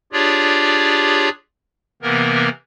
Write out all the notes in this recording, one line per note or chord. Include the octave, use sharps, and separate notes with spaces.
D4 F4 G4 G#4 C#5 D5
C3 E3 A#3 B3 A#4